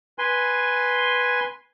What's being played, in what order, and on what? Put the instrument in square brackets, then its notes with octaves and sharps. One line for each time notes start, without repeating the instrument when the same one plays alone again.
[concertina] B4 G#5 C6